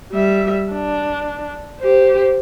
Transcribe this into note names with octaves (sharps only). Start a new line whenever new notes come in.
G3 E5
D4
G4 C5